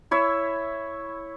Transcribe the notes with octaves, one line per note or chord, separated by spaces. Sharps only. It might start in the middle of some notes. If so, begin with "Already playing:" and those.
E4 C#5 E5